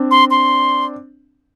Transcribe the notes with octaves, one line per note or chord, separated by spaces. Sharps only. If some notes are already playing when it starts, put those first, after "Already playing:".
Already playing: C4 D4
C6
C6